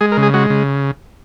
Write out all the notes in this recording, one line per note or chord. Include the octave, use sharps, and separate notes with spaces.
G#3 G#4
A#4
C#3
G#4
G#3 F#4
C#3